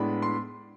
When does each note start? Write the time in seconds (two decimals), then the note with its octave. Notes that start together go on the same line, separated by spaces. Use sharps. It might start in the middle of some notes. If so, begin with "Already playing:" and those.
Already playing: A2 G#3 B3 D4 B5
0.22 C6